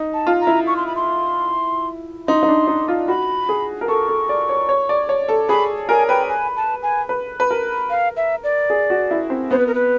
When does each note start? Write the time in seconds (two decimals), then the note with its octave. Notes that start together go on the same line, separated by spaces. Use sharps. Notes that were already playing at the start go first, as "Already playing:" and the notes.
Already playing: D#4
0.14 A5
0.27 F4
0.41 A#5
0.47 E4
0.67 C#6
0.76 C6
0.87 B5
0.96 C6
2.28 D#4 C6
2.43 D#4
2.48 D4
2.67 D#4
2.88 F4
3.08 F#4 B5
3.49 G#4
3.81 A#4
3.88 A4 C#6
4.08 A4
4.29 D5
4.49 C#5
4.69 C#5
4.89 D5
5.09 C#5
5.28 A4
5.49 G#4 B5
5.89 A#4 G#5
6.09 B4 G5
6.29 G#5
6.56 A5
6.83 G#5
7.09 B4
7.40 B4
7.51 A#4
7.90 F5
8.17 E5
8.44 D5
8.70 G#4
8.90 F#4
9.11 E4
9.30 C4
9.51 B3 C5
9.59 B4
9.67 A#4
9.74 B4